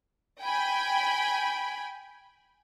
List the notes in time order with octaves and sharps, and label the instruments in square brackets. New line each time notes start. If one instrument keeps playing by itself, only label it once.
[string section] G5 G#5 B5